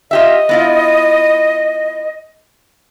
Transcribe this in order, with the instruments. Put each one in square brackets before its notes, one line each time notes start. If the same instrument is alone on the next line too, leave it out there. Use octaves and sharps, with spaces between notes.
[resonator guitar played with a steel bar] F4 G4 E5 [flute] D#5
[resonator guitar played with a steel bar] B3 E4 F4